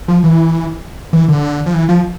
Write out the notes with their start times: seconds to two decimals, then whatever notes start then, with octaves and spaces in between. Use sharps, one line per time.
0.08 F3
0.24 E3
1.13 E3
1.29 D3
1.66 F3
1.74 E3
1.89 F3